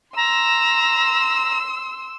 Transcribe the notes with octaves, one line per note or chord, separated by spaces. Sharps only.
A#5 C6 E6